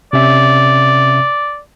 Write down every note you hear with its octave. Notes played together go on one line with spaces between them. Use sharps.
C3 C#4 D5 E5